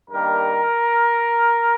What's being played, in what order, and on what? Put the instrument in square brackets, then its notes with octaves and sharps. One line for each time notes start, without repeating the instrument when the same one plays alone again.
[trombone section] G2 D#3 G3 A#3 A#4